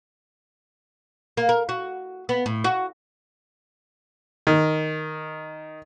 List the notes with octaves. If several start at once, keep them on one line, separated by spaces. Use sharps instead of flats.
A#3
A#4
F#4
B3
A2
F#4
D#3